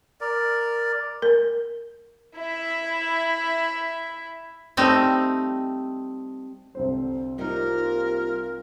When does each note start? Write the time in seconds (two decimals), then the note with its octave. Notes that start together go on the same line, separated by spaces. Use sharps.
0.21 A#4 D5
1.22 A#4
2.36 E4 E5
4.77 G3 A3 C4 D#4
6.75 C2 D3 C4 C5
7.38 G3 A#3 D#4 F4 A#4